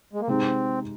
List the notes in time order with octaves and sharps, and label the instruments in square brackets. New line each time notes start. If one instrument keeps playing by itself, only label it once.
[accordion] G#3
A#3
[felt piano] C3 G#3 D#4 [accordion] C4